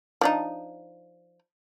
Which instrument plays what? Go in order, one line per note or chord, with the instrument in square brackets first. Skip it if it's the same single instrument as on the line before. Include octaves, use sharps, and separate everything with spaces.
[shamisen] F3 D4 D#4